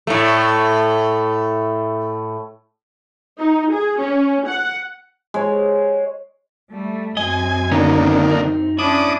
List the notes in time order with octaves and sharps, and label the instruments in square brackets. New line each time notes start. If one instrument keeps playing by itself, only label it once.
[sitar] A2 A3
[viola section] D#4
G#4
C#4
F#5
[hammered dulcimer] G#3 C#5
[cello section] G3 A3
[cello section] F#2 C4 [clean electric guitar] D#5 [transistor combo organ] G#5
[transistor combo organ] D3 D#3 A#3 [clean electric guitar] B3 C#4
[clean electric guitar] D#4
[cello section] C#4 D4 [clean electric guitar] E4 [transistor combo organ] D6 D#6